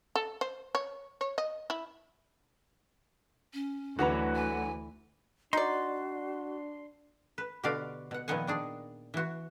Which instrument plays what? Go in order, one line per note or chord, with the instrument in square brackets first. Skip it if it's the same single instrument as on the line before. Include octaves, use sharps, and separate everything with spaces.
[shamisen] A4
C5
C#5
C#5
D#5
E4
[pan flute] C#4
[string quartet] D2 E3 [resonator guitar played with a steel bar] D3 F#3 A#5 [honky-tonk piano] F#4 B4
[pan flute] G#5
[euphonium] D4 [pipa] D#4 D5 [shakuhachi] F#4 [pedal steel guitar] C6
[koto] B4
B2 D3 F#4 G4 D5 F5
B2 F#5
A#2 D#3 F3 B3 F#5 G#5
D#3 D4 G#4
E3 F#4